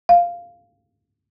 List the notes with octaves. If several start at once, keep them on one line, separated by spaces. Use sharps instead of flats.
F5